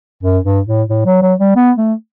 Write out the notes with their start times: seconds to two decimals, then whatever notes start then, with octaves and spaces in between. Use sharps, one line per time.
0.23 F#2
0.44 G2
0.67 A2
0.89 A2
1.06 F#3
1.22 F#3
1.40 G3
1.56 B3
1.78 A3